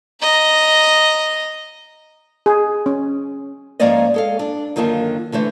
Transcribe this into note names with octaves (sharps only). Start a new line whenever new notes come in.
D#5 A#5
G#4
C#4
G#2 F3 A#3 C#4 D5 D#5
G#3 A4 F5
D4
F#2 D3 D#3 A#3 F4 A5
D3 E3 A3 C5